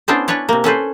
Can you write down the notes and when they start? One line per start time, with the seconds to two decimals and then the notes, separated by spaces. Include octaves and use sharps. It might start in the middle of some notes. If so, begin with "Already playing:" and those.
0.08 B3 C#4 D4 E4 C5 D5
0.28 C#4 D4 B4 C#5 D5
0.49 C3 A#3
0.64 C#4 A4 B4 C5